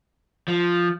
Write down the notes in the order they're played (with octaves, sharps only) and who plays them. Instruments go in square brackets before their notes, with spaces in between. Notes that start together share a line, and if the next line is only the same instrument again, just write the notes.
[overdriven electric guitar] F3